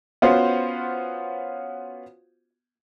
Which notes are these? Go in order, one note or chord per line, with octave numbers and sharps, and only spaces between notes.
B3 C#4 F4 F#4 C5